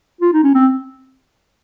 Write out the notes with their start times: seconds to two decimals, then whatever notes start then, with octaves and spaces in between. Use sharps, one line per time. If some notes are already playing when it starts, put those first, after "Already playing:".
0.21 F4
0.33 D#4
0.44 C#4
0.55 C4